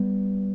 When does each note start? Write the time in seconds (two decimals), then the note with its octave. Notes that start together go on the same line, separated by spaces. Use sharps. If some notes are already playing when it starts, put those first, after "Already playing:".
Already playing: G3 B3